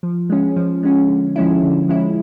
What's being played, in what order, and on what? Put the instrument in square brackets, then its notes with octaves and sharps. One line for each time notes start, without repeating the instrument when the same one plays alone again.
[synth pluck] F3
G#3 C#4
F3
G#3 C#4
D3
F3 G#3 C#4 E4
D3
F3 G#3 C#4 E4